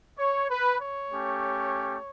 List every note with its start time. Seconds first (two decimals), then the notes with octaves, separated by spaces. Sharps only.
0.18 C#5
0.49 B4
0.80 C#5
1.10 A3 C#4 G4